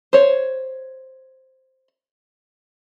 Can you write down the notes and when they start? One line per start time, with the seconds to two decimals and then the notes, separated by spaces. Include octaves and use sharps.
0.13 C5 C#5